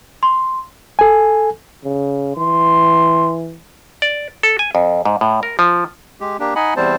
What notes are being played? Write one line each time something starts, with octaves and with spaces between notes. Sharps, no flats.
C6
A4 G#5
C#3
E3 C6
D5
A4
G#5
F2
G#2
A2
A#4
F3
G#3 G4
A#3 D4 G4
D#4 D#5 F#5 G#5 B5
E2 G3 C4 C5 A5